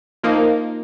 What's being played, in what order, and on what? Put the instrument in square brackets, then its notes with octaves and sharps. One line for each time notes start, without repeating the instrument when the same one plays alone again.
[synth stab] F3 A#3 D#4